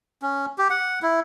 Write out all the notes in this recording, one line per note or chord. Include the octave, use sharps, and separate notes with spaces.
C#4
G4
F#5
E4